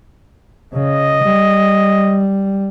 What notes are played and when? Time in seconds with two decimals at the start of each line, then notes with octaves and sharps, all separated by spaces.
0.74 C#3 D#5
1.24 G3